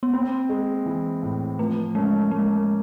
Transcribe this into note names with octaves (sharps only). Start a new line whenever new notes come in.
B3
A#3 C4
G#3
E3
A2
F3 A3
G#3 C#4
G#3 A#3